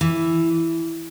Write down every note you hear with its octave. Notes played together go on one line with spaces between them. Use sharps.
E3